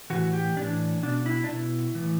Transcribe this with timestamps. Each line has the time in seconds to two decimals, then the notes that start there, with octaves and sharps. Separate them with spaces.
0.10 A2 E3 F#4
0.33 G4
0.56 A2 E3 D4
1.03 B2 D4
1.26 E4
1.44 D4
1.48 B2 E4
1.95 A2 E3